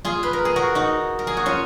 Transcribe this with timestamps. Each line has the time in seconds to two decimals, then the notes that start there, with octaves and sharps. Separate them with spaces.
0.05 F4 G#4
0.23 B4
0.33 A#4
0.45 G#4
0.56 F#4 A#4
0.75 D#4 F#4
1.19 A#4
1.27 G#4
1.37 F#4
1.46 C#4 F4